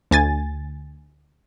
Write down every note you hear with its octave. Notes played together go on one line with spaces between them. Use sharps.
D2 G#5 A6